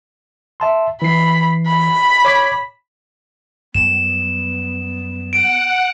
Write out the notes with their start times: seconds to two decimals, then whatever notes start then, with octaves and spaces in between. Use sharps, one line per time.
0.60 E5 A5 C6
1.02 E3 B5 C7
1.67 B5
2.25 C#5 D6 G#6
3.75 F#2 G3 B3 E7
5.33 F#5 D7